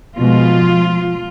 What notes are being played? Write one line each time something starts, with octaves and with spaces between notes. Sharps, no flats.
B2 F3 G#3 F4